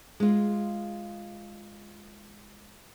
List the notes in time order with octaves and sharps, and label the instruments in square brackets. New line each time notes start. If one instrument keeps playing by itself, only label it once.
[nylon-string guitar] G#3 F4